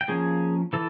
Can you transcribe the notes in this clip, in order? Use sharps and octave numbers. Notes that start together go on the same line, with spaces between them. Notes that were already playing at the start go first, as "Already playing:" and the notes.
G5
F3 A#3 C#4 G#4 G#5
E3 A4